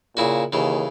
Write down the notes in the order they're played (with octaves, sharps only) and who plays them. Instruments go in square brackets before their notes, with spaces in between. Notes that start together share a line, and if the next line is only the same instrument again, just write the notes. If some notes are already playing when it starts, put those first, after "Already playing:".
[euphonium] A#2 [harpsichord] C#3 E4 F#4
[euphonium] D#2 [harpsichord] C#3 E3